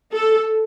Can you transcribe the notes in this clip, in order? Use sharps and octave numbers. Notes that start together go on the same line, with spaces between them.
A4